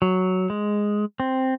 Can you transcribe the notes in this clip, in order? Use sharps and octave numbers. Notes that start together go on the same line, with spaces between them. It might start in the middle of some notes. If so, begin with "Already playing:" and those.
F#3
G#3
C4